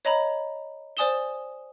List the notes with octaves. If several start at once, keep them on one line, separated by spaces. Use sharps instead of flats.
C#5 D#5 A#5 B5
C5 D5 G#5 D#6 E7 G7